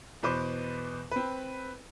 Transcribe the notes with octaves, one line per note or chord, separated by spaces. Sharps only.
E2 B2 B4 C5 D6
C4 B4